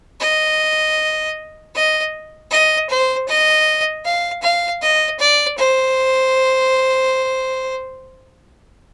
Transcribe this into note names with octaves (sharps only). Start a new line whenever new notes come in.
D#5
D#5
D#5
C5
D#5
F5
F5
D#5
D5
C5